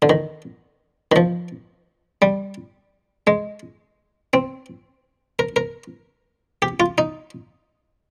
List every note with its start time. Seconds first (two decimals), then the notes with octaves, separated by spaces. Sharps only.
0.02 D3
0.10 D#3
1.12 D#3
1.16 F3
2.22 G3
3.27 G#3
4.34 C4
5.39 A#4
5.56 A#4
6.62 G4
6.80 F4
6.98 D#4